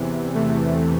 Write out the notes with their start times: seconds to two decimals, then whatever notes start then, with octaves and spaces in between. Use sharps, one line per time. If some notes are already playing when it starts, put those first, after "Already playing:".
Already playing: E2 C3 E3
0.35 E2 C3 E3 A3